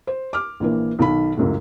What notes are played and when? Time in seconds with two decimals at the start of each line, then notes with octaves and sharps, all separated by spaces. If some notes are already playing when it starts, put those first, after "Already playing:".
0.07 C5
0.33 D6 F6
0.60 A#1 E3 A#3
0.99 B1 D#3 B5
1.37 C#2 F#2 A2